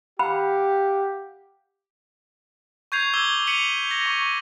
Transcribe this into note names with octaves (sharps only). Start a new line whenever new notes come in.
G4 F5 F#5 B5
C#6 G6 G#6 C7 F7
D6 E6 G6 G#6 G7
B6 C#7 D#7 F7 F#7
A#6
C#6